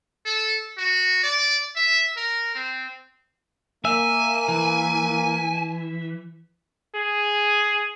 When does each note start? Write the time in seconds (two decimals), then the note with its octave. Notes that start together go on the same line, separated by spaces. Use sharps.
0.25 A4
0.78 F#4
1.23 D5
1.76 E5
2.17 A#4
2.55 C4
3.85 A#3 E5 G#5
4.48 E3
6.95 G#4